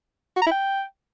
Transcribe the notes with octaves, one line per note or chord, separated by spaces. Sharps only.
F#4
A#5
E4
G5